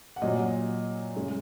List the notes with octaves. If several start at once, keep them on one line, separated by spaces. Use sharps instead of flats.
F#5
A#2 F#3 D#5
F#2 C#3 G#3